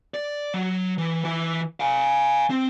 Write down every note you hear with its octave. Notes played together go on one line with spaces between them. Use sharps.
D5
F#3
E3
E3 E4
F5 G#5
C4